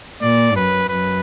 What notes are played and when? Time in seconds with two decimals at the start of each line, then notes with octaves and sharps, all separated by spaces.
0.22 A#2 D5
0.56 F#2 B4
0.89 F#2 B4